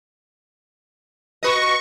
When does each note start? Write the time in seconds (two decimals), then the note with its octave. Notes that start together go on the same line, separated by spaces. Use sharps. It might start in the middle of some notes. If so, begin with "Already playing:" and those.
1.43 F#4 B4 D#5 C#6